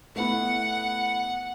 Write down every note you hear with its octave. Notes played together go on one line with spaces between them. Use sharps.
A3 B3 E4 F#5